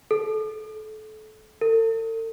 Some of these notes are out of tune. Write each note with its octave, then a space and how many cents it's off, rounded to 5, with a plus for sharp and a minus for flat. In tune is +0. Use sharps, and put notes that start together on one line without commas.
A4 -25
A4 +40